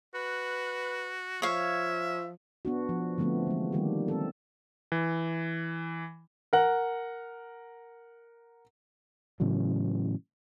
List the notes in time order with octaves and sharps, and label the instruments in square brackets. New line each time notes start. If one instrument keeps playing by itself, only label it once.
[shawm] F#4 [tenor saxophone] B4
[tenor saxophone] F3 [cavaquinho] C#5 F5 [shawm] E5
[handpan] B3 D4 F#4
F3
D3 F3 A3 B3 C4
E3 G#3
D#3 G3 A#3 C#4 G4
C4 A4
[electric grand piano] E3
[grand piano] A#4 F#5
[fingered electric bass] A2 C#3 E3 F#3